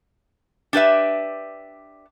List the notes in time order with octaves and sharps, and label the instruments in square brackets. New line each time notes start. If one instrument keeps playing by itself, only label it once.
[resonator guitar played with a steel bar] D4 G4 B4 E5